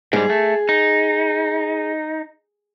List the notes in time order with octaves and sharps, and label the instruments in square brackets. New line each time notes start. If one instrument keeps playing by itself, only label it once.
[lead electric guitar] G#2 G3 [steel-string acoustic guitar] G#4
[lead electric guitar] A3
D#4